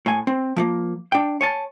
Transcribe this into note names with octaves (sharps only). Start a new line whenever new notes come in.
A2 G#5
C4
F3 A3 A#3
D4 G5
C#5 G#5 A5